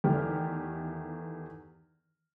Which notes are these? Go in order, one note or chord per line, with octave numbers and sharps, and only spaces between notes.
E2 D#3 A3 B3 G4 F6